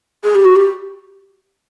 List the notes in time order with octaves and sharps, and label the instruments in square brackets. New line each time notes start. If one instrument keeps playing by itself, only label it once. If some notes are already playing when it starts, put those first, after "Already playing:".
[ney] G#4
G4
F#4
G4